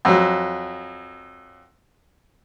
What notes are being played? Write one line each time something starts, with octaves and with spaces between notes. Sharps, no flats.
F2 F#3